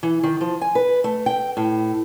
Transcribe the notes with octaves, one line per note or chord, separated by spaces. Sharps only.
E3
D#3
F3
G#5
B4
A3
G5
A2